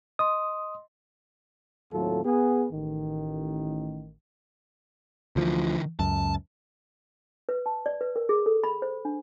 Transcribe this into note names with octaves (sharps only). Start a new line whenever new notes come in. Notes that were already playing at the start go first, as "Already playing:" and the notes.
D#5 C6 D#6
D#2 A2 F#3 C4 F4 A4
B3 G#4
A1 D#3
D2 D3 E3 F3
C#2 F#2 A5
B4
A5
D5
B4
A#4
G#4
A4
B5
C5
D4